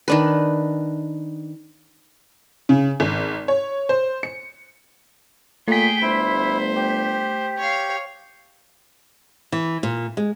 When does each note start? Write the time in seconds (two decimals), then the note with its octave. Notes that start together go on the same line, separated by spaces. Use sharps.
0.08 D#3 D4 B4
2.69 C#3
3.00 G#1
3.48 C#5
3.89 C5
4.23 C#7
5.68 A#2 A3 G#4 G5 B6
6.02 G1 E4 C5
6.76 G4
7.58 C#5 F5
9.52 E3
9.83 A#2
10.17 G#3